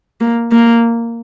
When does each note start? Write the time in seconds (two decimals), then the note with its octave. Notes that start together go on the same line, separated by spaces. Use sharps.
0.21 A#3
0.52 A#3